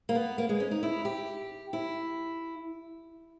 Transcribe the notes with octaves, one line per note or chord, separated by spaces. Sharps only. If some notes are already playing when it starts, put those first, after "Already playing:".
A#3
B3
A#3
G#3
C#4
D#4
E4
G4
E4